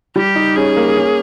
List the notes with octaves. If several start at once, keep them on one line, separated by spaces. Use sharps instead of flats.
G3 G4
D#4
C#4 G#4
A#3
C#4